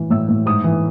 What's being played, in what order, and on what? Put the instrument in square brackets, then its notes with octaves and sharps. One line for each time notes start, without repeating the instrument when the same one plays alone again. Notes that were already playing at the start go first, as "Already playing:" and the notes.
Already playing: [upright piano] A2 E3
A2 E6
A2
G#2 D#6
E3